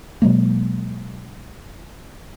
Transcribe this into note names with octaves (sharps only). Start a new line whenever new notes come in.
B2 F#3 G#3 A#3